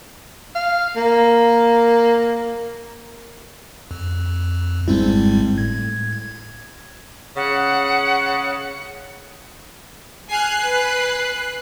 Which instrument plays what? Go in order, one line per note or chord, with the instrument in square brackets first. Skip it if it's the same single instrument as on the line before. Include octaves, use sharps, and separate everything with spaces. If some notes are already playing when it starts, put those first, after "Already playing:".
[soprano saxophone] F5
A#3
[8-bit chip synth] F2
[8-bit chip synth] G#1 G#2 G3 [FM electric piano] G#3 C4 E4
[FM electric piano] A2 [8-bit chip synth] G#6
[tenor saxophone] C#3 [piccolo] F#5
[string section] G#4 G#5 F6 [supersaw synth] F#6 C7
[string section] B4 G#5